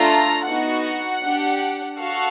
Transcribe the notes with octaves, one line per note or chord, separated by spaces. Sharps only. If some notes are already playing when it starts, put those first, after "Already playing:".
Already playing: A3 D4 F4 A4 A#5
B3 D#4 F#4 F#5
D4 G4
F#4 A4 F5